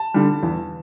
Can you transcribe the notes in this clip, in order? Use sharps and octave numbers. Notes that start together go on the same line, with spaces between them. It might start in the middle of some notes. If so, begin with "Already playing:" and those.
Already playing: A5
D3 G3
E2